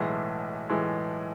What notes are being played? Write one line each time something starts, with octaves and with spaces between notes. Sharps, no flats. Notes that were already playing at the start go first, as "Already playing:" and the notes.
Already playing: B1 A2 E3 G#3
A2 E3 G#3